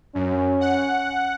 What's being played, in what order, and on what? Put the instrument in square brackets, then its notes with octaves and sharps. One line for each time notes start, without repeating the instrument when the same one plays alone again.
[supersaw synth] F#2 [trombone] C#4
[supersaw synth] F#5